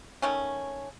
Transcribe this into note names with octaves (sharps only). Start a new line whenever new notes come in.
D#3 A3 C#4